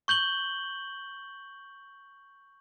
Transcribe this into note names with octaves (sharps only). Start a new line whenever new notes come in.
C#6 G6 F#7 G7